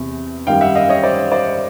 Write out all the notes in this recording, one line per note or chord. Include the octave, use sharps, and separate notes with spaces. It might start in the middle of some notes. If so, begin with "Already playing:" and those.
Already playing: E2 C3 E3
F#2 D#3 G3 F5 G5
E5 F#5
D#5 F5
C#5 D#5
C5 D5
C5 D5